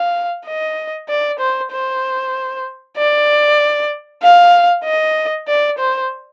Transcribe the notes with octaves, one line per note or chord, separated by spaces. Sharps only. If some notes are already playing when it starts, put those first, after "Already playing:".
Already playing: F5
D#5
D5
C5
C5
D5
F5
D#5
D5
C5